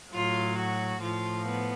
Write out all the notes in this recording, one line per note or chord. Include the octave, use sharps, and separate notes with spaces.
A2 F#3 F4
F#4
A2 F3 F4
B3